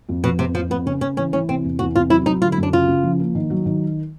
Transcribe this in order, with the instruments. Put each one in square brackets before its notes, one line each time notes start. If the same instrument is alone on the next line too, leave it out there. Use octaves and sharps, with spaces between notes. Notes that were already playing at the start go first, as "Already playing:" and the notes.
[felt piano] F2
[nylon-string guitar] B2 [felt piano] F3
[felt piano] F2 [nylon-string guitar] C3
[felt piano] F2 [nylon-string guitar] F3
[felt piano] F2 [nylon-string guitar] B3
[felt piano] C#3 [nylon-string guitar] C#4
[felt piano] C#3 [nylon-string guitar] C#4
[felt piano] E3 [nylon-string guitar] C#4
[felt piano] E3 [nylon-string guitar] C#4
[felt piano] C3 [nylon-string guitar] C4
[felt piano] E2
[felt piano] E2 [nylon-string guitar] F#4
[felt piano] C3 [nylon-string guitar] F4
[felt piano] F#3 [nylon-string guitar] E4
[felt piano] F#3 [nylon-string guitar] D#4
[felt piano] D3 [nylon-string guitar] F4
[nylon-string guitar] E4
[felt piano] F#2
[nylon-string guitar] D4
[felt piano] C#3 [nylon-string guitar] F4
[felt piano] C#3
F3
A#3
D#3
F#3
D#3